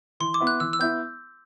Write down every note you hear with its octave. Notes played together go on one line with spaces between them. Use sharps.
E3 C6
D6
B3 E4
F#6
E3 E6
E6
B3 E4 G6